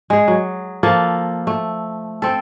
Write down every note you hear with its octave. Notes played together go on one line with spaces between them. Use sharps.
G#3 G#4
F#3
F3 A#3 A4
A3
C4 A4